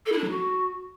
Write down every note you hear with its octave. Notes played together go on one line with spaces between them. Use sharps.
A4
E4
D4
F#3
F#4